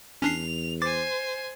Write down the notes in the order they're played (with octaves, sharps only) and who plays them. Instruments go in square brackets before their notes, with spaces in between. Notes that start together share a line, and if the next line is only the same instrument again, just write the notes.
[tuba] E2 [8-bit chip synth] C#4 D4 C7 [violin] F7
[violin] C5 G#5 [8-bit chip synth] D6 A6